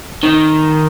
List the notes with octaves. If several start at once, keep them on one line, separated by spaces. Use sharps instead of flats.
D#3